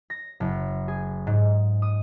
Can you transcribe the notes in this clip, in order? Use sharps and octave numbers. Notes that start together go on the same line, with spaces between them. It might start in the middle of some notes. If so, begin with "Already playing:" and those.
A#6
F#1
G#4
G#2
D#6